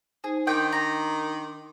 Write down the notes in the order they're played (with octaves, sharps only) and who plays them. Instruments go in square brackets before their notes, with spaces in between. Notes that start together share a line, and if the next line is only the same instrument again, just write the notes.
[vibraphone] D#4 C5 [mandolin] G#4
[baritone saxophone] D#3 [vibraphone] D4 C6 D6 [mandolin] G5
[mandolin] A#5